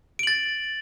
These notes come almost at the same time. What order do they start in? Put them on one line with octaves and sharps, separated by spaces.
D7 F#7 A6